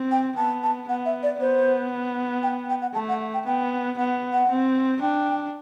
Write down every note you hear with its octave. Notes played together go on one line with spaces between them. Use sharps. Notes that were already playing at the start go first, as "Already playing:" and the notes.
Already playing: C4
G5
B3 A5
A5
B3 F#5
E5
D5
B3 C5
G5
G5
F#5
A3 A5
F#5
G5
B3 G5
B3 F#5
F#5
C4
D4 G5